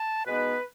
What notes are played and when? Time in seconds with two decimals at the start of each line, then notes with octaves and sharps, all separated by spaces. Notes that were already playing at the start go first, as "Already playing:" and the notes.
Already playing: A5
0.26 B2 G#3 B3 D#4 B4